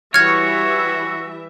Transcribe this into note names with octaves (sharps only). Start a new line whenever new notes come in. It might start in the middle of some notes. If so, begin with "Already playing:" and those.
E3 G3 F#4 C#5 E5 F6 G#6